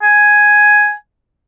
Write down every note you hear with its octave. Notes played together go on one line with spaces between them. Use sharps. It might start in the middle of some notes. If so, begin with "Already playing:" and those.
G#5